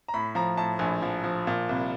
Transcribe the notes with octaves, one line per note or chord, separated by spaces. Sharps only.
A#5
A2 B5
F3 A#5
A2 A5
A#1 G#5
F3
F3
A#2
C2